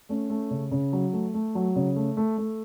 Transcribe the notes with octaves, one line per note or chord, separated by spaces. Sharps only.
A3 C#4
A3
C#3
C#3
F#3
A3
A3
F#3
C#3
A3
A3
A3